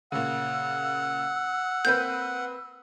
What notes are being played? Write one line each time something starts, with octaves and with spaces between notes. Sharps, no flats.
A#2 C#3 F#5 E6
A#3 C4 B4 G6